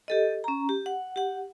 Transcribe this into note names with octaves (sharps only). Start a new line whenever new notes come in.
G4 A4 D#5
C#4 A#5
G4
F#5
G4 F#5